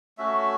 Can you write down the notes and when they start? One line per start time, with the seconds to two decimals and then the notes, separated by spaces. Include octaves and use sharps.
0.18 A3 C#4 F#4 E5